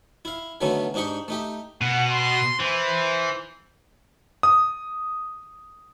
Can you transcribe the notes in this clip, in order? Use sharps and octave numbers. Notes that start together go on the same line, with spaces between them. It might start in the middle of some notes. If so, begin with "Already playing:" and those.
E4 F5
D3 D#3 F#3 A3 B3 C#4
G#2 D4 D#4 G4 C#6
A3 D#4 G4
B2 F#5
C6
E3 C5
D#6